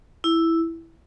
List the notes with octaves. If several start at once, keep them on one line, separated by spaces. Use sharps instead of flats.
E4